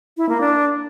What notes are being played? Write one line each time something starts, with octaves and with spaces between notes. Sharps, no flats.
E4
A#3
D4